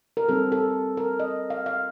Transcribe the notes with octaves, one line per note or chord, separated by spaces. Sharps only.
A#4
G3 C4 D#4 A4
A4
A#4
D#5
F5
F5